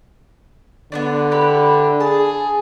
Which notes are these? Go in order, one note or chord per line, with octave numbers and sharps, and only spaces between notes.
D3 B3 D4 D5
E4 G4 B4
G#4 A5